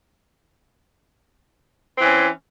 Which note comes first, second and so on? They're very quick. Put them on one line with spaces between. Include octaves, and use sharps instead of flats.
C4 E3 C#4